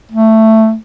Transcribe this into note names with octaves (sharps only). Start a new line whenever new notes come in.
A3